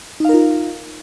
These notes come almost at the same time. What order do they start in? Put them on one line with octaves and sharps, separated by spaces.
D#4 F5 A#4 F4